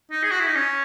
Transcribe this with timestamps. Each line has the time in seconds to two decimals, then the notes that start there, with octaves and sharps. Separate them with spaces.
0.11 D#4
0.23 G#4
0.31 F#4
0.40 E4
0.47 D#4
0.55 C#4